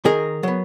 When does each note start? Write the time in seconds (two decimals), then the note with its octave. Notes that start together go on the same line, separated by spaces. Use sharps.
0.05 D#3 G#4 A#4
0.43 F#3 B3